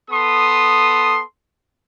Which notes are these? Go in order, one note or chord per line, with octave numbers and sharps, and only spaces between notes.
B3 A4 C6 D#6